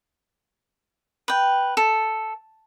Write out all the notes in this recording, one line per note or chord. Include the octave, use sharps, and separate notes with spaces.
B4 G5
A4